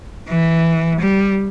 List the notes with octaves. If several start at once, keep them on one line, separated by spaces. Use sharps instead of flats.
E3
G3